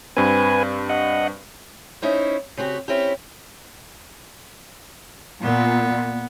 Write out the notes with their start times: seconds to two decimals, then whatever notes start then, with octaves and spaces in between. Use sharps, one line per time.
0.17 G2 C4 B4 G#5
0.89 D#5 F#5
2.02 C#4 D#4 E4 C5
2.57 C#3 C4 F#4 G4
2.88 C4 C#4 E4 G4
5.43 A#2 B3